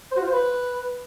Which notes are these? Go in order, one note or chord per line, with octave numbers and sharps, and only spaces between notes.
C5
F#4
F4
C5
B4